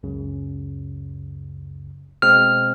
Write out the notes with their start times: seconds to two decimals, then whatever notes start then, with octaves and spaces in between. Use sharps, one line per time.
0.03 C#2 F#2 C#3
2.22 B2 G#3 C4 F6